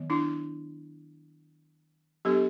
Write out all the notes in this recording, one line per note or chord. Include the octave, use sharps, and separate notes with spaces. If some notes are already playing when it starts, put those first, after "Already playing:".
Already playing: D#3 F#3 B3
D4 E4
F#3 B3 D4 G4 A4